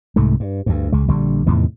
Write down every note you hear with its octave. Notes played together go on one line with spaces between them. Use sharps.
C2 G#2 C3 A3
G2
D2 G2
C#2 G#3
A#1 D3 G3
E2 A2 C3 D#3